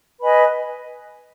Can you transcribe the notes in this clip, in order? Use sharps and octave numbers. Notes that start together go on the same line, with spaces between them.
B4 D#5 G#5 B5